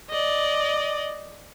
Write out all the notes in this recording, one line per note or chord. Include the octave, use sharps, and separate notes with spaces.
D5 D#5